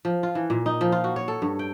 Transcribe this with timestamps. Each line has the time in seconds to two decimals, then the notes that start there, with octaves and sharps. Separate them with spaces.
0.05 F3
0.23 F4
0.35 E3
0.50 A#2
0.66 D#4
0.81 F3
0.92 F4
1.04 F#4
1.16 C#5
1.28 A4
1.42 G2
1.59 G5